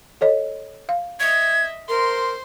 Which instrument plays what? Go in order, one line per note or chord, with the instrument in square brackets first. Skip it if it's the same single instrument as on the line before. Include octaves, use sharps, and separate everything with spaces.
[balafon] A4 C#5 D#5
F5
[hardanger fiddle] D#5 E5 [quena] G#6
[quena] A#4 [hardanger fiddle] C5 C6